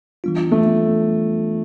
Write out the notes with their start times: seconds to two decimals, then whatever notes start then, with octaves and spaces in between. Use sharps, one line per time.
0.24 E3 G3 B3 D4 F4
0.52 A3